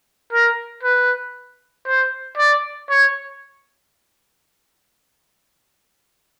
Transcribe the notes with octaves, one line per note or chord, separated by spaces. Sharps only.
A#4
B4
C5
D5
C#5